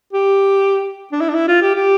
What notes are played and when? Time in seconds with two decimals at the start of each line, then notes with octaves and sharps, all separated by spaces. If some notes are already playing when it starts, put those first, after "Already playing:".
0.13 G4
1.12 D4
1.21 E4
1.29 D4
1.34 E4
1.48 F4
1.62 G4
1.75 G4